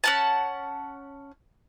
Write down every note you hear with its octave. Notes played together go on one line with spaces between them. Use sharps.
C#4 F#5 A5